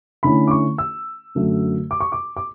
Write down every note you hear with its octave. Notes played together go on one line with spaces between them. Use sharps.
D3 A3 C#4 E4 B5
D6
C#6
E6
F#2 D3 F#3 A3
D6
C#6
D6
D6